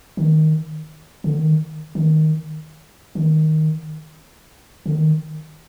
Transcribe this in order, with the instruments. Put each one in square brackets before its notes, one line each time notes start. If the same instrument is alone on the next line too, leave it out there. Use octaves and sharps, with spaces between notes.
[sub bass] D#3
D3
D#3
D#3
D#3
D3
D#3